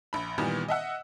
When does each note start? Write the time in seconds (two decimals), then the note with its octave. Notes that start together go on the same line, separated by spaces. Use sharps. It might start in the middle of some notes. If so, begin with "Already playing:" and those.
0.13 A#1 B5
0.38 A#2 D#3 E3 G3 B3
0.68 D#5 E5 F#5 E6